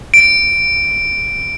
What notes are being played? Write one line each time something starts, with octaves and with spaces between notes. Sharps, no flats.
D7